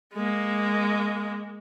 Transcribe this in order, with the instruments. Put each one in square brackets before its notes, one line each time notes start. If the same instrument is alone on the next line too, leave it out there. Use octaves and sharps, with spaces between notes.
[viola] G#3 A#3